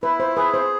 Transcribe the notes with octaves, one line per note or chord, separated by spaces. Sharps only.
E4 B4
C5
G#4 B4
C5